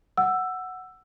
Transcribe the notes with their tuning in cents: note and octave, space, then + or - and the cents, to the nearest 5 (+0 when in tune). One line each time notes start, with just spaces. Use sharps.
F#5 +0 E6 +10